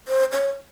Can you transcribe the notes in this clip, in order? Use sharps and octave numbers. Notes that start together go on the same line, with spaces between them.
C5
C#5